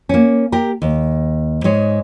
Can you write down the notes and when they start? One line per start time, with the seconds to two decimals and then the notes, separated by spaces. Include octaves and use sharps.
0.09 A#3 C#4
0.52 G4 A#4
0.82 D#2
1.64 G#2 G#3 C#5